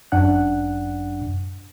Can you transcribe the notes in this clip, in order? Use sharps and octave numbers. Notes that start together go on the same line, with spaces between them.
G1 F#2 D4 F#5 F#6